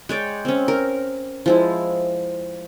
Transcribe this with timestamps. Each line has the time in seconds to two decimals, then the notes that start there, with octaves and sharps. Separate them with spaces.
0.09 G#3 C#5 D5 G5
0.45 C4 C#4
0.68 A#4
1.46 F3 G#3 E4